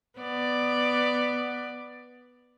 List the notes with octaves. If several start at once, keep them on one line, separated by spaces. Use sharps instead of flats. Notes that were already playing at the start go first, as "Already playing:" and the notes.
B3 D5